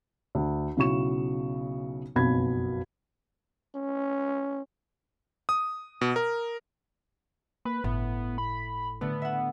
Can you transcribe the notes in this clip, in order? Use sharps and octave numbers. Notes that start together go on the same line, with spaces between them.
D2
B1 C#3 F#3 E4 C#6 E7
F#1 B1 F2 B2 B5 G#6
C#4
D#6
B2
A#4
A#3 B4
G1 A2 B3
B5
D3 A3 B3
E5 F#5